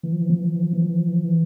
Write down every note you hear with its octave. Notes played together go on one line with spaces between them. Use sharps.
E3
F3
E3
F3
E3
F3
E3
F3
E3
F3
E3
F3
E3
F3
E3